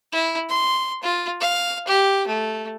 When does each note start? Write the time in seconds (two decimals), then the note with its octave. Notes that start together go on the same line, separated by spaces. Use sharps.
0.12 E4
0.49 C6
1.03 F4
1.40 F5
1.87 G4
2.27 A3